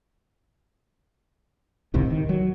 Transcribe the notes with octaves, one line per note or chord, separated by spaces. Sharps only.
C#2 A2 C3 D#3
D#3
F#3